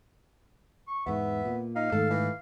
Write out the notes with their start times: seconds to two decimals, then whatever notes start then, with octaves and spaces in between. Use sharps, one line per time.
0.88 C#6
1.06 E2 G#2 B3 E5
1.45 A#2
1.76 D#4 F5
1.92 G#2 D#3 A3 A4
2.10 E3